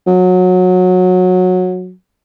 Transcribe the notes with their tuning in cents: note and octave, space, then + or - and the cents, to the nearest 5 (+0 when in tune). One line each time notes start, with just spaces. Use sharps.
F#3 -20